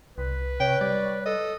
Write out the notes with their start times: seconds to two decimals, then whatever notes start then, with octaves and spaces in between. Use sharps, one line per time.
0.18 C2 B4
0.60 C3 C#5 G5
0.81 G3 D5
1.26 A4 D#5